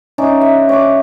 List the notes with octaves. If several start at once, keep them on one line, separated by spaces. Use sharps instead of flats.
C#4 D#4 D5 E5
E5 F#5
C#5 G5 C#6 D6